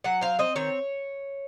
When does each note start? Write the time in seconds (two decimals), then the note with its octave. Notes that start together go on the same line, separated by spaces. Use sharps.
0.04 F#3 F#5
0.21 C4 F5
0.39 C4 D#5
0.56 D#3 C#5